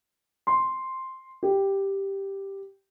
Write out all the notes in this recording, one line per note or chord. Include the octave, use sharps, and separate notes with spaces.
C6
G4